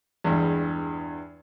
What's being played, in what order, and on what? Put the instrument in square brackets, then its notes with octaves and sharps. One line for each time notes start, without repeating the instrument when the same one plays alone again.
[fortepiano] E2 G2 G#3